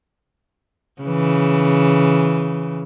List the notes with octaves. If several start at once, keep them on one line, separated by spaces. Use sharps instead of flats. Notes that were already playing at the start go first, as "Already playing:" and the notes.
C#3 E3